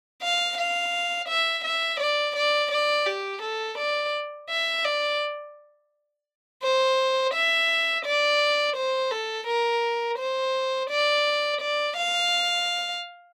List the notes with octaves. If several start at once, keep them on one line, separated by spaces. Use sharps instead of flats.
F5
F5
E5
E5
D5
D5
D5
G4
A4
D5
E5
D5
C5
E5
D5
C5
A4
A#4
C5
D5
D5
F5